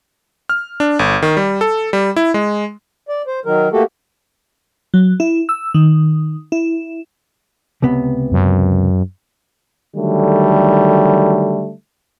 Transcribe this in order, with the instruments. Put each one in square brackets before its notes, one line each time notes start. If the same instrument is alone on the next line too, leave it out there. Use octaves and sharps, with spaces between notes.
[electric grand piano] F6
D4
G1
D#3
G3
A4
G3
E4
G#3
[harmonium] D5
C5
D#3 F#3 A#4
A3 A#3 F#4 G4 A4
[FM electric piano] F#3
E4
E6
D#3
E4
[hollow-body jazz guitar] C#2 C3 B3
[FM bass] F#2
[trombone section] D3 D#3 F#3 G3 A3